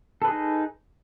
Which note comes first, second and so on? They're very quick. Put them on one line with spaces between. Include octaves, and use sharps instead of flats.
A4 B4 G#4 D#4